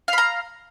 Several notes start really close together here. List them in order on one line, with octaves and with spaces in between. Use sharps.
F5 B5 A#5